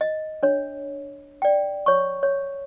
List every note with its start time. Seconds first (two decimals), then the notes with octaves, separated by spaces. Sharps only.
0.01 D#5
0.43 D4 C#5
1.42 D5 G5
1.86 C#5 C#6
2.23 C#5